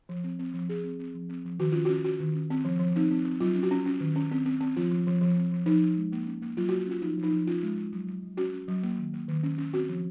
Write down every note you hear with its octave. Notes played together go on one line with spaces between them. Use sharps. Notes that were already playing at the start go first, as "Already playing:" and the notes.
F3
C4
C4
F3
F3 G#4
C4
C4
F3
C4
F3
D#3 F#4
C#4 F4
F#4
C#4
C#4 F#4
D#3
C#4
C4
F3
F3
C4 D#4
C4
C4
F#3 F4
C#4
F#4
C#4
C#4
D#3
C#4
C4
C4
C4
F3 F4
F3
F3
F3
C4
F3
F3 D#4
F3
G#3
A#3
C#4
A#3
F#3 F4
F#4
A#3
F#4
C#4 F4
F3 D#4
F3
D#4
F3
C#4 F4
G#3
G#3
F#3
F#3
F#3
C#4 F#4
C#4
F#3
A#3
D#3
A#3
D#3
C#4
C#4
C4 F#4
F3